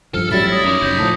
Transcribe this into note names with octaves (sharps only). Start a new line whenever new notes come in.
G2 F3 A4 F6
A1 F#3 G3 E4 A6
C#5 D#6 A#6
F#2 D#4 B5 D6 D#6
F#1 G6 A#6 B6
A2 F3 A5 D#6